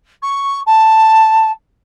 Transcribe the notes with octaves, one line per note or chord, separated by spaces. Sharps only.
C#6
A5